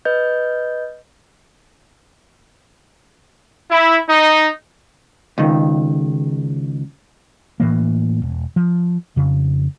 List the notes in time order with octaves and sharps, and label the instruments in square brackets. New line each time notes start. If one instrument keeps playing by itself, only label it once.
[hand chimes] B4 D#5 G6
[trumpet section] E4
D#4
[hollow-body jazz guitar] C#2 D#3
[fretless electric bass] A2 E3 A#3
E1
F3
F2 C#3